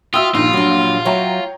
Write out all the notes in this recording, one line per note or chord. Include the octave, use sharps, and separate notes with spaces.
F4 F#4 E5 G5 D#6 E6
A#1 G2 A#2 D#4 F4
F#3 D4
F#3 C#5 E5 G5 A#5